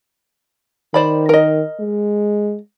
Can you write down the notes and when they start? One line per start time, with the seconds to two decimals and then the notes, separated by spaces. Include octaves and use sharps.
0.94 D#3 C5 D5 B5
1.29 A#4 D#5
1.80 G#3